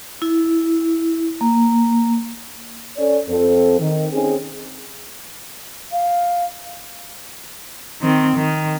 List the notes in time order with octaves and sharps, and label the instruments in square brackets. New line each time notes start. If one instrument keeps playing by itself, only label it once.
[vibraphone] E4
A#3
[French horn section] C#4 A4 C#5 D5
F2 C4 A4
D#3
C4 C#4 D#4 G#4
[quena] F5
[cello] D#3 C4
D#3